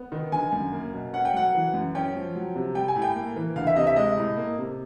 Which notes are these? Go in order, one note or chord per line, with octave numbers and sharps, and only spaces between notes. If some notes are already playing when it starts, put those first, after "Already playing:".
Already playing: B3
D#3
G1 G#5
F#2
A#3
B2
C#4 F#5
G5
F#3 F#5
E3
F#2
C#4 G5
F3
F#3
C3
G3 G5
G#5
A2
G5
A#3
E3
D2 F5
E5
C3 D#5
E5
G#3 D#5
A2
A#3
C3